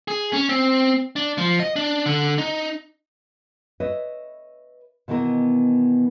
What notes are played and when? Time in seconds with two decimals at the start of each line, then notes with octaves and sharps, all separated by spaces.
0.08 G#4
0.33 C#4
0.49 C4
1.16 D4
1.38 F3
1.60 D#5
1.76 D4
2.06 D3
2.38 D#4
3.80 B4 C#5 D#5 E5
5.08 B2 D#3 E3 B3 A#4